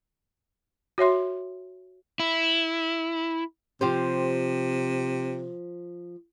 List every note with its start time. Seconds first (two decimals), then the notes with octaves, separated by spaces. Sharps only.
0.98 F#4 C#5 E5 C6
2.20 E4
3.81 C3 F3 G4 C5